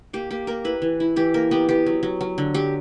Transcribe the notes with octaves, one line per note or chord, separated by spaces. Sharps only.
A#3 G4
A#3 G4
A#3 A#4
E4 B4
E3
E4
E3 G4
A#3 A#4
B3 G4
B3 G4
F#3
F#3
F#3
D3
F#3 G4